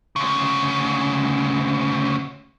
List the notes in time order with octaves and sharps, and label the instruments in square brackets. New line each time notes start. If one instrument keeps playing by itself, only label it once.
[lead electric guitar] D2 C#3